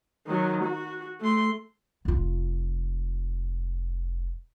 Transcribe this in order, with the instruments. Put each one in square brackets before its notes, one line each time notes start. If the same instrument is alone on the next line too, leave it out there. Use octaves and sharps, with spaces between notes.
[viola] D#3 F#3
F#4
A3 C6
[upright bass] F1 F4